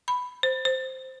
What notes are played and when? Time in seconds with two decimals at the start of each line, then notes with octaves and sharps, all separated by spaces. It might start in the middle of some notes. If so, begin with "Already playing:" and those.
0.08 B5
0.43 C5
0.65 C5